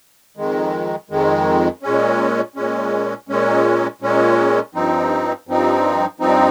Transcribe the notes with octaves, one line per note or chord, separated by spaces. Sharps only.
F2 D#3 G#3
F2 D#3 G#3
A#2 G#3 C#4
A#2 G#3 C#4
A#2 G#3 C#4
A#2 G#3 C#4
G2 F3 C4 D#4
G2 F3 C4 D#4
G2 F3 C4 D#4